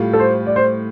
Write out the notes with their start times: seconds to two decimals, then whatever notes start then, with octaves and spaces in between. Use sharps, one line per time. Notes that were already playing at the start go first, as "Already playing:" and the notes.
Already playing: A2 G3 F4
0.13 A4
0.19 C5
0.47 D5
0.56 C5